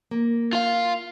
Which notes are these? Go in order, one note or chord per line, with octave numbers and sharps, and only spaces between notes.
A#3
F4 F5